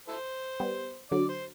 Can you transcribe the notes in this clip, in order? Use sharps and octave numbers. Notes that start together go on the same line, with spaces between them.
E4 A4 C5
G3 B3
D3 F#3 D5
C5